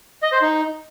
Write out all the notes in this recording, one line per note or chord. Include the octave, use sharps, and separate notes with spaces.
D#5
C5
D#4